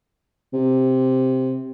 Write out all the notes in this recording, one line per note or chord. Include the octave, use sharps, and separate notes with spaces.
C3